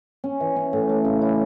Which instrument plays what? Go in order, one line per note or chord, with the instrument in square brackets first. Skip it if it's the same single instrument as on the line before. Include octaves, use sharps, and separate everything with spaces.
[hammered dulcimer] C#4
E3
C#4
A2
A3
C#3
E4